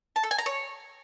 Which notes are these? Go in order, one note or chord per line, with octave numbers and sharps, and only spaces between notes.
A5
A4
G#5
A#5
C#5